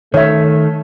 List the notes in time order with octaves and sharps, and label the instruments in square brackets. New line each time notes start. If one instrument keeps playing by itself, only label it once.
[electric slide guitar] D#3 [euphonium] A3 [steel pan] C#5 E5